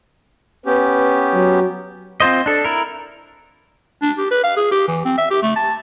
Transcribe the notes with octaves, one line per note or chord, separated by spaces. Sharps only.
B3 C#4 G4 B4
F#3
C4 F4 C5 D#5
D4 A4
E4 A#4
D4
G4
B4
F5
G#4
G4
E3
C4
E5
G4
A3
A5